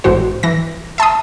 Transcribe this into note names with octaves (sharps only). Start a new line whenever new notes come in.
A1 E2 G#2 F#4 C5
E3 A#6
E5 A5 C6 D#6